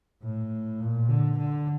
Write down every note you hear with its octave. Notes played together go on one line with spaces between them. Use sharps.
A2
A#2
D3
D3